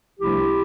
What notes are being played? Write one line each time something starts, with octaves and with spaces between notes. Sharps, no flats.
C2 C3 F3 A3 D4 E4 G4